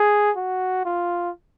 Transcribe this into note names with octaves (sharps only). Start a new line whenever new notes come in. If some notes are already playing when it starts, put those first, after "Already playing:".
Already playing: G#4
F#4
F4